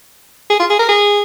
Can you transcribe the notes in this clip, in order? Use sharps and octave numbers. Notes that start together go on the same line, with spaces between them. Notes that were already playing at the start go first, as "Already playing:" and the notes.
G#4
F4
G#4
A#4
G#4